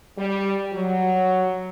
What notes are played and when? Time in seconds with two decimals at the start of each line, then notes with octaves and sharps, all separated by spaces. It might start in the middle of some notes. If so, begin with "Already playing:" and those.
0.18 G3
0.73 F#3